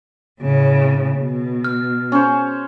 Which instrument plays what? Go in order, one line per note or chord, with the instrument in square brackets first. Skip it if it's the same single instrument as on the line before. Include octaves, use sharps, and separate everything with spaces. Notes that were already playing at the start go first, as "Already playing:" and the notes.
[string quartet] A2 C#3
B2
[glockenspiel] F6
[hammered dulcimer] C#4 C5